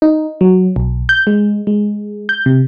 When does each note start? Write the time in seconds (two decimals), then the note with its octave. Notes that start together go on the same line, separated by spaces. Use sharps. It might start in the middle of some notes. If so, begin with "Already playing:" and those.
0.02 D#4
0.41 F#3
0.76 B1
1.09 G6
1.27 G#3
1.67 G#3
2.29 G6
2.46 C3